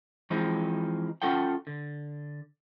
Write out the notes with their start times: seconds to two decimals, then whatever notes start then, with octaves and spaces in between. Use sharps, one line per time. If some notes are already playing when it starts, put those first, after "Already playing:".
0.30 E3 F3 G#3 C4 D#4
1.22 C#4 F4 A4 F#5 G5
1.67 D3